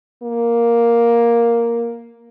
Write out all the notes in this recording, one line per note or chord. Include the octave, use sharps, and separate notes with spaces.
A#3